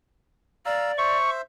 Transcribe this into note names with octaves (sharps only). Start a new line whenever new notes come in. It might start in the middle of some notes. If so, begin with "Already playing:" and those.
D5 F5 A#5 E6
C5 E5 C#6